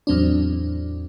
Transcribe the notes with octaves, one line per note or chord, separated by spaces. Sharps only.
E2 A2 F#3 C4 D4